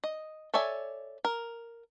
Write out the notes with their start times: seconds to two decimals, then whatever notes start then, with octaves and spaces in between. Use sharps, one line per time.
0.04 D#5
0.54 A4 C#5 D5 E5 G#5
1.25 A#4